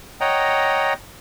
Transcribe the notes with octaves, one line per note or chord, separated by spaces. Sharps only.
C#5 D#5 F#5 G5 A#5